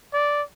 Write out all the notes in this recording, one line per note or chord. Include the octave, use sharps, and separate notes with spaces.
D5